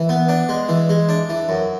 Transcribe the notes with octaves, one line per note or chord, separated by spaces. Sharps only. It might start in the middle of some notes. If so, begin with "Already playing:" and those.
Already playing: E3
B3
D4
G#3
E3
G#3
D4
E3
F#2